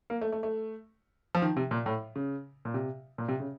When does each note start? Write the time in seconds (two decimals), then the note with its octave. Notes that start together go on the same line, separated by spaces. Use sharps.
0.10 A#3
0.21 A3
0.32 A3
0.43 A3
1.35 F3
1.42 D#3
1.56 C3
1.71 A#2
1.86 A2
2.16 C#3
2.65 A#2
2.74 C3
3.18 A#2
3.28 C3
3.40 C#3